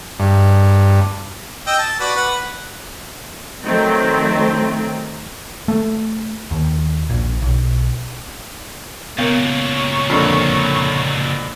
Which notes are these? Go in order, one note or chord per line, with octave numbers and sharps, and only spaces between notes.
G2
D#5 G5 E6
A5
F#4 B4 D5
B4 F#5
D#3 F#3 A3 C4
A3
D#2
A#1
B1
C#2 A#2 B3 A#4 C#5 F5
F2 D3 A#3